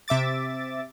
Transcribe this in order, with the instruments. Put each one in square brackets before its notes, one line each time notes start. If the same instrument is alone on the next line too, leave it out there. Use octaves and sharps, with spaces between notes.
[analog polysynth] C3 E5 D6 A6